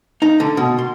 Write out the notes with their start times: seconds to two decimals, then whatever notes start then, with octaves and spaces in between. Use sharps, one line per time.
0.22 D#4
0.40 D3
0.57 B2
0.79 C6